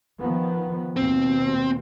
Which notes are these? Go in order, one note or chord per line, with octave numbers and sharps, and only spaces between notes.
D#3 F3 B3
D#2 B2 C4